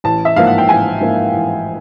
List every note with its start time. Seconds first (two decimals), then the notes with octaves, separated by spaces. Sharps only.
0.04 A1 A5
0.25 E5
0.36 G#2 F3 A#3 F5
0.47 F#5
0.58 G5
0.68 A1 G#5
1.00 G#2 F3 A#3
1.33 A1